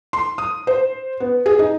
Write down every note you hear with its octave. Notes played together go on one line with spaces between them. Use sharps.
C6
D#6
C5
B3
G#4
D#4